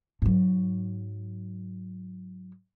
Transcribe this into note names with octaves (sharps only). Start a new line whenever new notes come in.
G#2 F#3